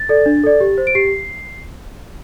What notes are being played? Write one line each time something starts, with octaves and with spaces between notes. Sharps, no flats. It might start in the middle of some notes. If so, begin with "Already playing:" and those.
Already playing: A6
A4 D5
D4
A4 D5
G4
C5
D7
G4 C7